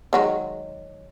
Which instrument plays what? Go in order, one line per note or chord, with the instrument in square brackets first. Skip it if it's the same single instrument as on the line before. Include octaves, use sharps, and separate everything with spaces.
[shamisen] D#3 F#3 G#3